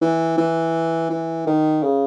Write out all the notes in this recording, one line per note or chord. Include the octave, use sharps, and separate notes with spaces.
E3
E3
E3
D#3
C#3